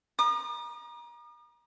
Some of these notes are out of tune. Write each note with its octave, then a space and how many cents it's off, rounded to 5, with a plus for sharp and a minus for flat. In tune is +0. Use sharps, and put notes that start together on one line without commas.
A#5 +35 D#6 -45